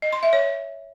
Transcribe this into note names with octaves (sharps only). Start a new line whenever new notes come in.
D#5
C6
E5
C#5